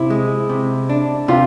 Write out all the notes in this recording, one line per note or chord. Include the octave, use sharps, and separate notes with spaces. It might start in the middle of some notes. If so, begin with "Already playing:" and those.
Already playing: C3 E4
G#3
C3
D4
C3 F4